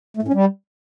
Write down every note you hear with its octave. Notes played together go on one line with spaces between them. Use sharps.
A3
A2
C#4
G3